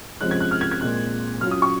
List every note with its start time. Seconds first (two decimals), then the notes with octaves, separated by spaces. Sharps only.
0.20 C3 F3 G#3 C#4 F#6
0.31 G#6
0.40 F#6
0.51 F6
0.61 G#6
0.71 G#6
0.81 A#2 G#3 C4 F#6
1.41 F#3 C#4 F4 F6
1.51 D#6
1.62 C#6